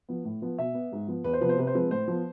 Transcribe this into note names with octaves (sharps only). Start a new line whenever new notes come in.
F3 B3
A2
F3 B3
B2 E5
B3
G#2
F3 B3
E2 B4
C5
C3 F3 B3 B4
C5
C3 B4
C5
F3 G#3 C4 B4
A2 C5
F3 B3